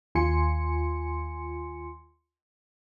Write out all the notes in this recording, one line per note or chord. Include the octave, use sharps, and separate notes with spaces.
D#2 F4 G#5 C6 C#7